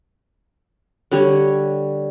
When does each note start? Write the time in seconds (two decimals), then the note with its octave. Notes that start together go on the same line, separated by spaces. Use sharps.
1.11 D3 G3 C#5